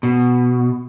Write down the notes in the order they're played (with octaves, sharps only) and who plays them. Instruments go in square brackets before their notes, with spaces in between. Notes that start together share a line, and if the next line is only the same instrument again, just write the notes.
[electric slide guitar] B2